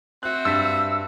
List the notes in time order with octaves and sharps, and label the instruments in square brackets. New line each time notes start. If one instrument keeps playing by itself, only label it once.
[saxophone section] C4 F#4 E5 [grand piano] F#6
[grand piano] G2 A6 B6 [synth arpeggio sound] E6